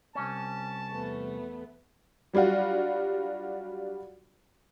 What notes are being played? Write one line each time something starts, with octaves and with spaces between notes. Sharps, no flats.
C2 C#4 A5
E2 A3 B3
F#3 G3 D4 F4 F#4